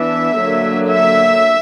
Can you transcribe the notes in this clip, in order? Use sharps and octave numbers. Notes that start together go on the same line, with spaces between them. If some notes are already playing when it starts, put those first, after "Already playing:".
Already playing: E3 B3 D4 E5
D3 F#3 A#3
E5